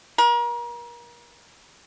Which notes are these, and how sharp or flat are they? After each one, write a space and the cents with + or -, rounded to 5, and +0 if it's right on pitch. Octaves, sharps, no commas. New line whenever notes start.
A#4 +35